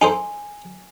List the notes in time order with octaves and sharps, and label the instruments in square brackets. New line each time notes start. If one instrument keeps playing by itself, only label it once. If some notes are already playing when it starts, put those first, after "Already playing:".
[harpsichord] D#4 A4 C5 [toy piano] G#5